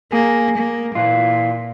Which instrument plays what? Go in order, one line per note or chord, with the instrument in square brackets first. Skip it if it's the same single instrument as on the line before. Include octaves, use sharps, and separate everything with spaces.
[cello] A#3 [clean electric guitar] G#4
[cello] A#3
[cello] A#2 [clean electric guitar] E3 F4